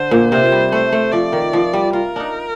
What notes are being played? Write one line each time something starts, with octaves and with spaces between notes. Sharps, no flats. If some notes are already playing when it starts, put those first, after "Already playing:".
Already playing: D3 C5
A#2
C3 C5
G3
A3 C5
A3
F3 D5
D#3
F3
G3
F4 A#4
D4 D#4